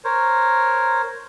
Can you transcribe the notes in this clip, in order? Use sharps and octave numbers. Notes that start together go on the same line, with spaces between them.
A#4 C5 C#5